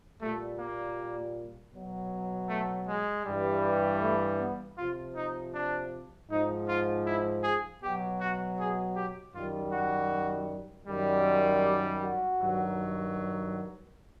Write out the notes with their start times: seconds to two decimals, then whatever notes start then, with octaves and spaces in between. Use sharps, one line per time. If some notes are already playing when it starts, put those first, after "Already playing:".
0.21 A#2 G3 A3
0.59 A#3
1.73 B2 F#3
2.49 A3
2.87 G#3
3.25 G2 E3 G3
4.02 A3
4.39 B3
4.78 C3 F3 F4
5.16 D#4
5.54 D4
6.30 G#2 F3 D#4
6.68 F4
7.06 E4
7.44 G#4
7.82 B2 F#3 G4
8.20 F#4
8.58 G#4
8.96 G4
9.34 F#2 D#3 G3 F4
9.72 F#4
10.87 F#2 D#3 G3
11.63 G4
12.01 F#4
12.39 G2 D#3 F#3